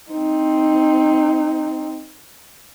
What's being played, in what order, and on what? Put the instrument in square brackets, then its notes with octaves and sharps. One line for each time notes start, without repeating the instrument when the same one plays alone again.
[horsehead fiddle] C4 D#4